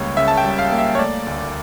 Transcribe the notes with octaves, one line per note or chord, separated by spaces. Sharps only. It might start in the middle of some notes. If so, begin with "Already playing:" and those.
Already playing: C#2 G3 A#3 C#5
C#3 E5
A5
G5
G3
F5
A#3
E5
C#5
A3 D5
D2